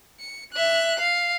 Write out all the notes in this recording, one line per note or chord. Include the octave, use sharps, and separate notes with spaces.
C#7
E5 F#6
F5